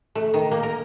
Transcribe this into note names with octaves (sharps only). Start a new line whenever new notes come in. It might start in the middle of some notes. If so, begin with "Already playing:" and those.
A3
D#3
A#3
A#4